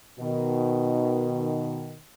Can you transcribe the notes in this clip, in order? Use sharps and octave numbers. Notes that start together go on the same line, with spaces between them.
B2 D#3